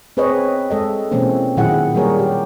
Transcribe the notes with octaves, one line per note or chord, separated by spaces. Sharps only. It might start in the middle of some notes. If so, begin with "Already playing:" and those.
C4 G#4 B4 C#5 D#5
G#3 A4 D#5
B2 E3 G#3 A#3 C4 C#4
A#2 D#3 F#3 E4 G#4 F#5
F#3 G3 A#3 G#4 A#4 C#5
G4